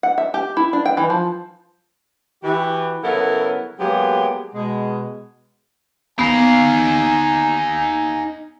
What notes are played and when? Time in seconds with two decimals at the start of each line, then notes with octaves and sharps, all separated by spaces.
0.03 F#5
0.18 E5
0.34 G4
0.57 E4
0.73 D4
0.86 G5
0.97 E3
1.10 F3
2.44 E3 F#4 G4
3.04 C#3 F#3 B3 E4 A4 A#4
3.80 F#3 G#3 A#3 B3 G4
4.55 B2 G#3
6.19 B3 D#4 F5 G#5